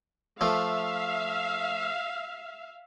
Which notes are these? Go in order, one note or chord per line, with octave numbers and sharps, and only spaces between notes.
F3 A3 E5 F5